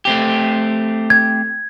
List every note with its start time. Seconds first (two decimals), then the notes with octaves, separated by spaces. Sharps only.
0.05 A3 C4 G4
1.10 G#6